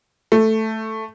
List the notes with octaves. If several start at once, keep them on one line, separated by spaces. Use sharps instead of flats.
A3